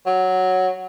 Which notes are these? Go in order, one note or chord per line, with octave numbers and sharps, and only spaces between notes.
F#3